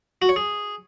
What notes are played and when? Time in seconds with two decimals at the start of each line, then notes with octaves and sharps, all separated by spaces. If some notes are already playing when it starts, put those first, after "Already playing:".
0.22 F#4
0.29 C#5
0.36 G#4